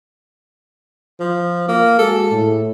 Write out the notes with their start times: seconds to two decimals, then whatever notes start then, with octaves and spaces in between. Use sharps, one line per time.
1.20 F3
1.68 A#3
1.99 G#3 F#4 G#4 A4
2.31 A2